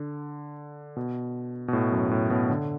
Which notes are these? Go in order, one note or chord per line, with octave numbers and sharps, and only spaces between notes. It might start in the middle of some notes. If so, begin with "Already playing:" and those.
Already playing: D3
B2
B2
A2
F#2
A2
B2
D3